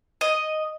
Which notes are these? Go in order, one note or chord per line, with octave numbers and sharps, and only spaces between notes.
D#5